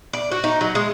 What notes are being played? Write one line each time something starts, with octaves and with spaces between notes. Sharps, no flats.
D5
F#4
D#4
F#3
G#3